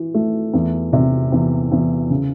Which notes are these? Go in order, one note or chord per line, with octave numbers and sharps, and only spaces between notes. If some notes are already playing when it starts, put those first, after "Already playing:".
Already playing: E3
A3
E2
C3
E2
E2
C#3